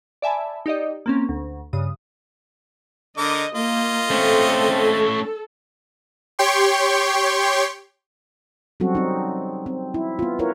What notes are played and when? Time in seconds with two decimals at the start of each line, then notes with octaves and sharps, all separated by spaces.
0.22 D5 E5 G#5 A5 B5
0.66 D#4 G4 D5 D#5
1.06 A#3 C4 C#4
1.29 D2
1.73 G2 C#3 D#6
3.17 D3 A#4 D#5 D6
3.55 A#3 F4 D#5
4.10 A3 C4 C#4 A4
6.39 G4 C#5 G5 C6 C#6
8.80 F#3 G3 C4 C#4 F#4 A4
8.95 C4 D#4
9.66 C4
9.94 E4
10.19 B3 F4
10.39 E4 F4 A#4 B4 C#5